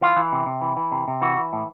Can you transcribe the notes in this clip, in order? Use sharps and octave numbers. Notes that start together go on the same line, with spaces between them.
E3 F4
E3
C3
C3
E3
E3
C3
C3
E3 F#4
E3
A2